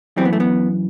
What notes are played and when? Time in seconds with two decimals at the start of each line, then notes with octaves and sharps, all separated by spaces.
0.16 F#2 E3 G3 C4
0.25 B3
0.33 A3
0.40 B3